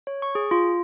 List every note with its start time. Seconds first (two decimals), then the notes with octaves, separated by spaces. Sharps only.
0.07 C#5
0.22 C#6
0.35 G#4
0.51 F4